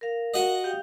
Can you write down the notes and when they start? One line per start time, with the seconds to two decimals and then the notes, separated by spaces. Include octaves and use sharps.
0.01 A#4 F5
0.34 F#4 D#5
0.64 G4 F5 G5